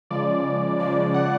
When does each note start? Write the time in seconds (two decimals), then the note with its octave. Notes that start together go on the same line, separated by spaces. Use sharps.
0.11 C#3 F3 G#3 D5
0.79 C#3 F3 G#3 D5
1.14 F#5